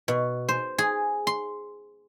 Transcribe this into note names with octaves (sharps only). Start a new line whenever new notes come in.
B2
C5
G#4
C6